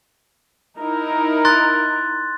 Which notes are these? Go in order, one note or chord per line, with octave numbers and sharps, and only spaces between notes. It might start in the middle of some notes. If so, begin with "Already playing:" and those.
D#4 E4 A#4
C6 F#6 A6